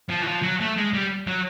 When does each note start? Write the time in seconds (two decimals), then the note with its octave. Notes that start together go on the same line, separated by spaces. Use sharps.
0.10 F3
0.22 E3
0.27 F3
0.43 F#3
0.60 A3
0.77 G#3
0.94 G3
1.27 F#3